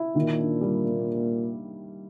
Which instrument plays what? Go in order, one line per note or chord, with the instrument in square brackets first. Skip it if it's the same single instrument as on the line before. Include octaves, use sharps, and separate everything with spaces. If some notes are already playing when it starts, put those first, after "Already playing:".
Already playing: [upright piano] E4
[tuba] A#2 [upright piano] D#3
[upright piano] D4
G3
A#3